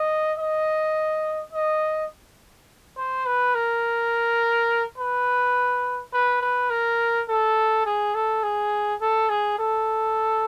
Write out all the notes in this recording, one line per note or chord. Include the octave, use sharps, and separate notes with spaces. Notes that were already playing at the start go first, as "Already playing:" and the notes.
Already playing: D#5
D#5
D#5
C5
B4
A#4
B4
B4
B4
A#4
A4
G#4
A4
G#4
A4
G#4
A4